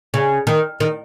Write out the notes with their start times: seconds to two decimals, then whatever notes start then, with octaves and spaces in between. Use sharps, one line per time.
0.14 C#3
0.47 D#3
0.80 D#3